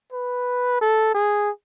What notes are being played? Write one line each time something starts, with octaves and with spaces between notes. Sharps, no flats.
B4
A4
G#4